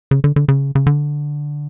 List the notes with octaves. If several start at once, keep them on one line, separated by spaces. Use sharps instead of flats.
C#3
D3
D3
C#3
C#3
D3